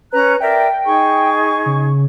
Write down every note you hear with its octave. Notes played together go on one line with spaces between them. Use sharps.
C#4 B4 A#5 F#6
A#4 D5 E5 G5
D#4 G#4 C#6
C#3